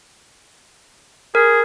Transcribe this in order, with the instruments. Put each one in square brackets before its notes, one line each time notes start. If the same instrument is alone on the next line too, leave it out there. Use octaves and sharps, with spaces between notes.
[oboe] G#4 [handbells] A#4